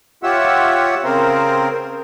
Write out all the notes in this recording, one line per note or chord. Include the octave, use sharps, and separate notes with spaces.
F4 G4 C#5 E5 F#5 E6
C#3 C4 A#4 C5